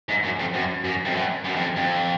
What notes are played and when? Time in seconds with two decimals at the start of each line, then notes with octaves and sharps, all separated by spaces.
0.09 G#2
0.24 F#2
0.39 F2
0.54 F#2
0.84 F#2
1.06 F2
1.15 F#2
1.45 F#2
1.56 F2
1.77 F2